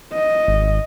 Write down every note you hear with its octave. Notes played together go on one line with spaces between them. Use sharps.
D#5
G#1